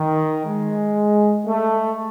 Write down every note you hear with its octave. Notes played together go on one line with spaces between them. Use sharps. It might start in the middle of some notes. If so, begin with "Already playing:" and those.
Already playing: D#3
G#3
A3